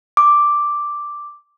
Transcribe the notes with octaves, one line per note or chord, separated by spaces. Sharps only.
D6